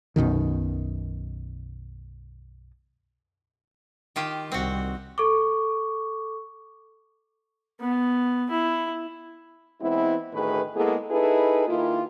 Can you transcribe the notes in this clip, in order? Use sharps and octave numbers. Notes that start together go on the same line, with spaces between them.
B1 F#2 B2 D#3
D#3 F4 G4
C2 C4 F#4
A4 C#6 D6
B3
E4
E3 G#3 B3 C4 E4
D2 A2 D#3 G#4 B4
G#3 A#3 B3 E4 G#4 A4
D#4 E4 G#4 A4 B4
D#3 A#3 E4 F4